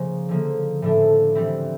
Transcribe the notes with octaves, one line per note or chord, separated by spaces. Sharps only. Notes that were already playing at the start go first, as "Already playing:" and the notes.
Already playing: C#3 F3 A#3
D3 F3 A#3
A2 F3 A3 D4
E3 G3 C4 E4